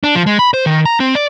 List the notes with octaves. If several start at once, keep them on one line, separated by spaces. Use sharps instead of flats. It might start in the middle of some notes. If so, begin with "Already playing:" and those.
D4
F3
G#3
B5
C5
D#3
A#5
C4
D5